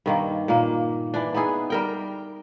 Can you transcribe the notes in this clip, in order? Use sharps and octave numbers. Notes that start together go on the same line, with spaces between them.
G2 D#3 A#3
A#2 A#3
E3 D4
B3 D#4 E4 G#4
G3 A#4 G5